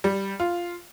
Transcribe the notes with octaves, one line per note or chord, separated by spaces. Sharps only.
G3
F4